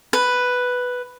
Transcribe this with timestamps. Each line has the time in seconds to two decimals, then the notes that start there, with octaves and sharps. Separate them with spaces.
0.13 B4